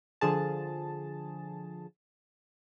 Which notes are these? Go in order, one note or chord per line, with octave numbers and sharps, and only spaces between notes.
D3 F3 G#4 A5